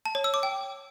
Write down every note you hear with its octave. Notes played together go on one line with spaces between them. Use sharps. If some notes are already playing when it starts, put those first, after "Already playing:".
A5
C#5
E6
D6
G5